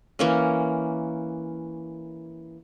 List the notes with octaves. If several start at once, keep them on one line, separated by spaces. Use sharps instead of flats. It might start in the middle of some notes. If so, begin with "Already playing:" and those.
E3 A#3 C#4